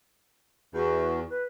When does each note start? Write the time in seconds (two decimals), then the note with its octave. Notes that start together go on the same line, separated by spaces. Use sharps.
0.74 E2 F#4
1.30 B4